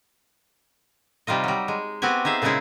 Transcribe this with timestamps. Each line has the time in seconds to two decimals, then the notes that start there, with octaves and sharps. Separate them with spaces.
1.27 C3 G3 D#4 F4 D#5
1.44 F#3 G3
1.68 G#3
2.02 B3 C4 F#4 G4 G#5
2.25 D#4 G#4 E5 F5
2.42 A#2 C#3 G#3 D#4 E4 G#4